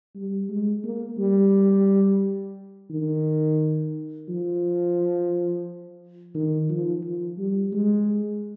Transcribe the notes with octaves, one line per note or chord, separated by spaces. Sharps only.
G3
G#3
A#3
G3
D#3
F3
D#3
F3
F3
G3
G#3